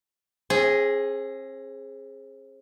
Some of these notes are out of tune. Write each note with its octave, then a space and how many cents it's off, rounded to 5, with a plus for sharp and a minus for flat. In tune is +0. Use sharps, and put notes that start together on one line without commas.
C4 +40 G#4 +0